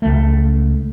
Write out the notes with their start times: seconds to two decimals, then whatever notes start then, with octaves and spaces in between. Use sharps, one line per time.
0.02 C#2 A3